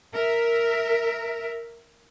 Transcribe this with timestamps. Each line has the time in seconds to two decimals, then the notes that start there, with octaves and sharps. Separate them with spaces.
0.13 A#4 E5